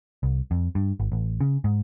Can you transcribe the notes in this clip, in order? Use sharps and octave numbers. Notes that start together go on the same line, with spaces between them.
C2
F2
G2
G#1
A1
C#3
G#2